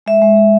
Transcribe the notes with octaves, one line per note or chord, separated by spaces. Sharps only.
G#3 E5
G#3
G#3